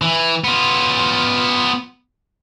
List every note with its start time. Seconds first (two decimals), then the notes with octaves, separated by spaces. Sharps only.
0.02 E3
0.44 B3 F4